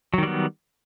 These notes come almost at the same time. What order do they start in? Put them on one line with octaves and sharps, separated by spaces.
F#3 D#3 G3 B3